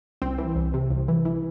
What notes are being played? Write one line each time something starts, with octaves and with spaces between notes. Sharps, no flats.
C2 C4
E3
C2
C3
C2
E3
E3